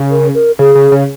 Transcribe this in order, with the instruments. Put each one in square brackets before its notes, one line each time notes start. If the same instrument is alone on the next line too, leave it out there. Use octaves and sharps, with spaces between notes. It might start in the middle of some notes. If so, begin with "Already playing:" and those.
Already playing: [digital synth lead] C#3
[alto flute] A#4
A#4
[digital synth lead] C#3 [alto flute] G#4
[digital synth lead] C#3
C#3